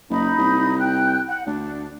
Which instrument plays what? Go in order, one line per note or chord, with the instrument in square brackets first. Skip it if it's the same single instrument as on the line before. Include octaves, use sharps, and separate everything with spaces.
[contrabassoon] F#1 [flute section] D#4 B5
[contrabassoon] C2
[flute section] G5 F#6
F#5
[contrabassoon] D2 [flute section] D4